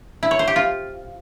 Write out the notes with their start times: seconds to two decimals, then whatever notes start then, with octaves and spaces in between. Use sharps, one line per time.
0.23 E4
0.31 C#5
0.39 C5
0.48 G4
0.56 F4